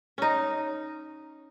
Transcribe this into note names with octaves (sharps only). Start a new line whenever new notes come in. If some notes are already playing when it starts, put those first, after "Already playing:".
C#4 D#4